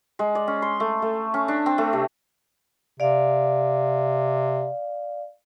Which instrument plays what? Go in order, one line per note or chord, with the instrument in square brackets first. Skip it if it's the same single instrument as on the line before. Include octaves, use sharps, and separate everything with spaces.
[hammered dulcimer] G#3
D5
C#4
C6
A3
A3
C#4
D4
C4
A3
C3
[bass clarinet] C3 [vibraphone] D5 F5